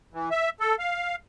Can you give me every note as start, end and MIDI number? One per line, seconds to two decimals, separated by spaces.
0.14 0.29 52
0.31 0.50 76
0.60 0.75 69
0.79 1.16 77